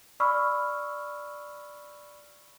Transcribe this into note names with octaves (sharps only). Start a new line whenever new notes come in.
D5 B5 C#6 E6 F6